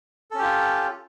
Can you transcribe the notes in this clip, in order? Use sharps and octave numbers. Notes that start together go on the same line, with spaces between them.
C#4 F4 G4 A4